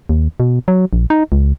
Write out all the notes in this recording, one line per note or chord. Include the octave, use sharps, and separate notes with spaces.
D#2
B2
F#3
A#1
D#4
C#2